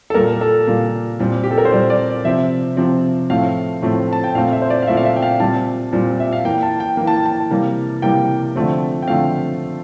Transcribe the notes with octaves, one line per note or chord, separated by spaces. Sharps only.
A4
A#2 G3 A#3 A#4
A4
A#2 G3 A#3
A#2 G3 C4
G4
A4
A#4
C5
A#2 G3 C4 D5
D5
C3 F3 C4 E5
C3 F3 C4
A2 F3 A3 C4 F5
A2 F3 A3 C4
A5
G5
A#2 A3 C4 F5
E5
C5
D5
F5
A#2 A3 C4 E5
F5
E5
G5
F5
A#2 G3 C4 A5
A#2 G3 C4
E5
F5
E3 A#3 G5
A5
G5
E3 A#3
A5
G5
A5
C3 E3 G3 A#3
C3 E3 G3 A#3 G5
D3 F3 A3 C4
G5
D3 F3 A3 C4 F5